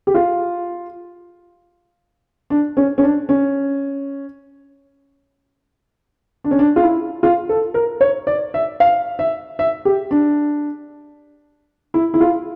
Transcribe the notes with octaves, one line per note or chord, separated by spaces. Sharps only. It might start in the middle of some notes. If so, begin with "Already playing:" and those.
G4
F4
D4
C#4
C#4
D4
C#4
D4
C#4
D4
F4
E4
F4
A4
A#4
C#5
D5
E5
F5
E5
E5
G4
D4
E4
E4
F4